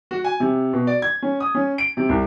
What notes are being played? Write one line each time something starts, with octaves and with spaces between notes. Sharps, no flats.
F#4
G#5
C3
B2
D5
G#6
C#4
D#6
C#4
D7
C3
C2